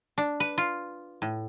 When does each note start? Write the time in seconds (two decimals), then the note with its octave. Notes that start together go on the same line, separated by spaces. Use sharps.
0.18 D4
0.40 B4
0.58 F4
1.22 A2